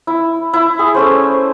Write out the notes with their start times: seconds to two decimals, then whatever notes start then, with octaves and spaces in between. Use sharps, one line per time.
0.07 E4
0.53 E4
0.79 G#4
0.95 A3 C#4 C5